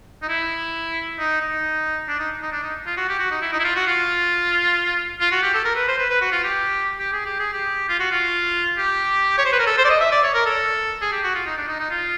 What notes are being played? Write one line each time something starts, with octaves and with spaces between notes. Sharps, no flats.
D#4
E4
D#4
D#4
D4
D#4
D#4
D4
D#4
F4
F#4
G4
F#4
D#4
E4
D#4
E4
F4
F#4
F4
F4
F#4
G4
A4
A#4
B4
C5
B4
B4
F#4
F4
G4
G4
G#4
G4
G#4
G4
F4
F#4
F4
G4
C#5
C5
B4
A#4
A4
C5
D5
D#5
E5
D5
C#5
A#4
A4
G#4
G4
F#4
F4
D#4
D4
D#4
D#4
F4